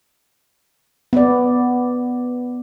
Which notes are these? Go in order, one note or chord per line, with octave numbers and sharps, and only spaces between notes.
B3 D5